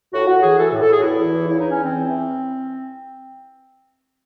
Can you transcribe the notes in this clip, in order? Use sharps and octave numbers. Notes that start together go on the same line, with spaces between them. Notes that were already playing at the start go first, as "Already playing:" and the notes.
A2 F#4
A2 F#4
E3 G#4
E3 A4
A4
A2
A4
A2 G#4
F#4
E2 E4
E3
E2
C#3 E4
E2 D#4
C#4
E3 C4
E2
E3